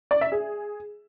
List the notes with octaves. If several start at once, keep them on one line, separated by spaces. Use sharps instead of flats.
D5
E5
G#4